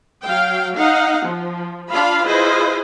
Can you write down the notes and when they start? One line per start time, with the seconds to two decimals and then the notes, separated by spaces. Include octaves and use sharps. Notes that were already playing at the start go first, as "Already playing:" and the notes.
0.25 F#3 F5 G5
0.76 D#4 F5 F#5
1.26 F3
1.90 D4 F4 F5 B5
2.26 E4 F4 G#4 B4 C5 D#5